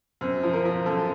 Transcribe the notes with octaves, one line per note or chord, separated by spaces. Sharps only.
F#2 C4
F3
A#4
F3
F#2 A4